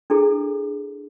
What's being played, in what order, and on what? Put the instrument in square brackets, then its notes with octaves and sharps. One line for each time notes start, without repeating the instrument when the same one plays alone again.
[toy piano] D4 E4 G#4 A4